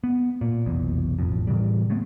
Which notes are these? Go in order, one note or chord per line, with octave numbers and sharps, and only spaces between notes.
B3
A#2
F1 B1 E2
E1 A1 F2
A2 C#3 E3 G3
G#3 A3 B3 C4